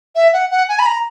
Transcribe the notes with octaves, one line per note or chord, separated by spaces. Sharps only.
E5
F#5
F#5
G#5
B5
A#5